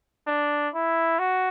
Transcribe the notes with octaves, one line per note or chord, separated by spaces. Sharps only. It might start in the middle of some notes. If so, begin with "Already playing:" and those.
D4
E4
F#4